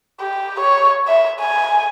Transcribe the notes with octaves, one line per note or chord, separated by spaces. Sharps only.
G4
C#5
E5
G#5